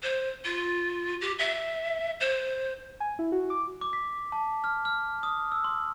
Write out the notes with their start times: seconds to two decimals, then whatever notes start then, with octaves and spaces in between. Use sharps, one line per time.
0.02 C5
0.44 F4
1.21 G4
1.38 E5
2.20 C5
3.00 G#5
3.19 E4
3.32 F#4
3.50 D6
3.81 D6
3.93 B6
4.32 A5
4.64 F6
4.85 F6
5.23 D#6
5.52 E6
5.64 C6